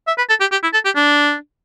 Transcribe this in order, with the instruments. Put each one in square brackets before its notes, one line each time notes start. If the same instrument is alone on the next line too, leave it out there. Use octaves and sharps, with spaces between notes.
[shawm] E5
B4
A4
G4
G4
E4
A4
G4
D4